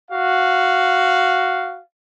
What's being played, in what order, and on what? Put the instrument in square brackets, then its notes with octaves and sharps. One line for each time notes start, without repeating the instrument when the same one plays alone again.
[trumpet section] F#4 F5